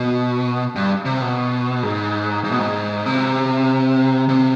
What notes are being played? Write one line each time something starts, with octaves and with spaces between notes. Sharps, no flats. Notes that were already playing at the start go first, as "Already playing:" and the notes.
Already playing: B2
G2
C3
B2
G#2
G#2
B2
G#2
C3
C3